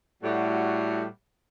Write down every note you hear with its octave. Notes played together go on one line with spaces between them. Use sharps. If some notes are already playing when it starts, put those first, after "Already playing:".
A2 G3 F#4